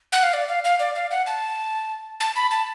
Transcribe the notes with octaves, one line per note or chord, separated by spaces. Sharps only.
F#5
F5
D5
F5
F5
D5
F5
F#5
A5
A5
B5
A5